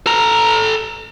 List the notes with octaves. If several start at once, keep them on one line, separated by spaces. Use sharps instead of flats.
A4 A#5